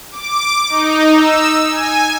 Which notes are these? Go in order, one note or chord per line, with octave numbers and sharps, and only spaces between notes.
D6
D#4
E6
G#5